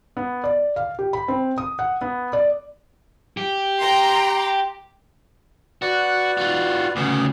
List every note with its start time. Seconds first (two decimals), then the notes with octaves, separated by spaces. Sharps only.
0.17 B3
0.44 D5
0.76 F5
0.99 G4
1.13 B5
1.28 C4
1.58 D#6
1.79 F#5
2.01 B3
2.33 D5
3.37 G4
3.80 G5 A#5 C6
5.82 F#4 B4 D5
6.37 F4 F#4
6.96 D2 C#3 B3 D6 D#6